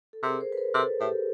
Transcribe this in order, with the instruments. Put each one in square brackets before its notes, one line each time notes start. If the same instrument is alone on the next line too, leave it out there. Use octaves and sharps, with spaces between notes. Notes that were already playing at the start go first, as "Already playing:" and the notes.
[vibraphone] A4
[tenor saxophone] C3 [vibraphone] G#4 A#4
[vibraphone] A#4 C5
B4
A#4 C5
[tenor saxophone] C3 [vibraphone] A4 B4
[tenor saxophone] A2 [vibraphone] G4 A4